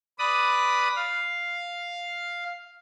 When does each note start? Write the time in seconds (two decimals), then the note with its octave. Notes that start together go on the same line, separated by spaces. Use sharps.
0.19 B4 D5 B5 D#6
0.96 F5